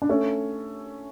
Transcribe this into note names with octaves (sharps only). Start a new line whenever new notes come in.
D4
A3 C#4